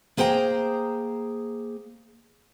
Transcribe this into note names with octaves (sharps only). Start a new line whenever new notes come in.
A#3 G#4 C5 G5 A#5